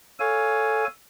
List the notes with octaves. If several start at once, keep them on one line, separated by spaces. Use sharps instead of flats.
A4 C#5 F5 G#5